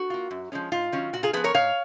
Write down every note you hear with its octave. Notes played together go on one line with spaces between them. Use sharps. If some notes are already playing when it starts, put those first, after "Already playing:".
Already playing: F#4
A#3 F4
F#2
F3 G#3 C#4
G#2 F4
D#3 F#3 C#4
A#2 F#4
F4 G#4
F3 B3 G#4 B4
A#4 C#5
G#2 C#5 F5